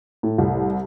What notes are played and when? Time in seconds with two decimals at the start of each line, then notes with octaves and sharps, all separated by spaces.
0.23 A2
0.38 C2